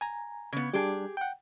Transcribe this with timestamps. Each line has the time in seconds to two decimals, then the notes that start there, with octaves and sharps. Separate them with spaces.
0.01 G#5 A#5
0.53 C#3 B3 G#6
0.73 G3 D4 G4 G#4
1.17 F#5 G5